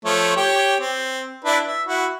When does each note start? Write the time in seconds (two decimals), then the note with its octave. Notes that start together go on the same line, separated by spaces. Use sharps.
0.05 F3 A3 C#5
0.36 G4 C#5 G5
0.80 C4
1.44 D4 E4 B4
1.67 E5
1.87 E4 F#4